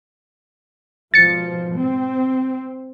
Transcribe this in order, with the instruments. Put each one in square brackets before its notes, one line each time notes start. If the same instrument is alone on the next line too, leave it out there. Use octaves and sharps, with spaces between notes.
[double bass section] G#1 B2 F3 [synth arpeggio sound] A6 C#7
[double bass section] C4